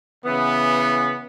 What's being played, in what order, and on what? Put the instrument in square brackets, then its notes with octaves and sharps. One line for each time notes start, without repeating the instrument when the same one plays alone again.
[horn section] C#3 E3 B3